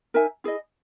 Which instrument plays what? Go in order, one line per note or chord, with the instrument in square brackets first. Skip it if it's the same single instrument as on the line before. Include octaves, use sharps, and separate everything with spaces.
[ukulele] D#4 A#4 E5 G#5
E4 G#4 D#5